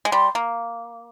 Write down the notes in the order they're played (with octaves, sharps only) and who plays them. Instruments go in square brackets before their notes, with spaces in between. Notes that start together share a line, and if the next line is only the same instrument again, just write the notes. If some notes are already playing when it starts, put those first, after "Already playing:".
[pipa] G#3
[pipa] G3 [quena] C6
[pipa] A#3